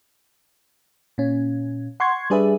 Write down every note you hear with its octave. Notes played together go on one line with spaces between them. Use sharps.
A#2 C#4
F#5 C6 C#6 G#6
G3 D4 G#4 B4 E5